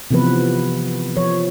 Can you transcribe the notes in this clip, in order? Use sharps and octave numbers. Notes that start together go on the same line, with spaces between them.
C3 E3 F3 B3 B4
F3 C#5